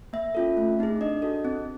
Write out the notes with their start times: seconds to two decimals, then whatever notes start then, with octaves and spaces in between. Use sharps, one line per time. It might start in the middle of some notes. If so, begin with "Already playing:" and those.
0.13 A#3 E5
0.35 C#4 F4 A4
0.57 A3
0.79 C4 D#4 G#4
1.01 D4 D#5
1.22 F#4 A4
1.45 C4